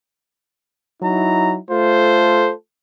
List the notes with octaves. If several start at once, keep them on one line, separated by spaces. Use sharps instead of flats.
F#3 D#4 E4 A#5
A3 F4 A4 C5